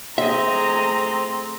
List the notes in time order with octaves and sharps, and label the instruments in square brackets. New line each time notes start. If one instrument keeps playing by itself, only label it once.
[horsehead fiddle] A3 A#5 [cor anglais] C4 [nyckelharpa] G#4 D#5 [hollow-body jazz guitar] E5